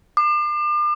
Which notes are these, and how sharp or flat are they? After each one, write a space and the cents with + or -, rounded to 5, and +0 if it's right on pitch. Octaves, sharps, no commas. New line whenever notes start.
D6 +40